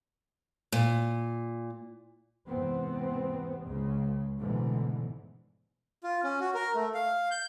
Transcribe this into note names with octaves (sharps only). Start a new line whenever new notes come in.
A#2
E2 G#2 C3 B3 C4
C#2 C#3 G#3
A1 G#2 B2 D3 E3
F4
C#4
F#4
A#4
A3
F5
G6